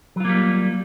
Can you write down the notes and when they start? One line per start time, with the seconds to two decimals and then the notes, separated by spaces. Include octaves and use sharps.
0.16 F#3
0.20 F4
0.25 A#3
0.29 G3